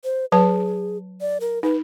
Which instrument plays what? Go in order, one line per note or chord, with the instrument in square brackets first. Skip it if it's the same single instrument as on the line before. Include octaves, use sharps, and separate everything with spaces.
[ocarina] C5
[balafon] F#3 B4 A5 [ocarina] G#4
[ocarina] D5
A#4
[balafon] D#4 [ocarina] B4